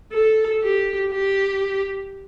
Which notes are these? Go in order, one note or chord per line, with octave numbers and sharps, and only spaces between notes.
A4
G4
G4